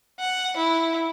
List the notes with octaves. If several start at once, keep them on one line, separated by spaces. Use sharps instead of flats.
F#5
E4